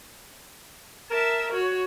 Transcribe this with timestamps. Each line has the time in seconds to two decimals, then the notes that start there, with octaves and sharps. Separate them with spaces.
1.11 A#4 E5 A5
1.52 F#4 C#5